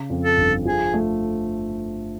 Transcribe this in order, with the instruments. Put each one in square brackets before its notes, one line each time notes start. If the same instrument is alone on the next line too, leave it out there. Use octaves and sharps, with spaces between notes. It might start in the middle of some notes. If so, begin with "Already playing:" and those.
Already playing: [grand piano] C#3
F2
[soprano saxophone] A4
[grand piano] G1
[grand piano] F3 [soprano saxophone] G#4
[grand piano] A3